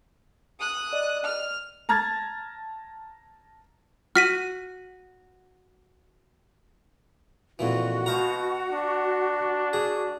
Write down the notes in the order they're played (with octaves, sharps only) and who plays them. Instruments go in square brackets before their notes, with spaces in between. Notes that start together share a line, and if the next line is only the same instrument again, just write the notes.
[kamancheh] D#6 F#6
[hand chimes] D5 D#5
[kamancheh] F6
[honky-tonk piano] A5 A#5 F6 G#6 A6
[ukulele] F#4 [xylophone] F6 B6 D#7
[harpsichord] F2 A#2 E3 [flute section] F#4
[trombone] B2 [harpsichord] C5 F5 A#5
[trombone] D4
[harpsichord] G#4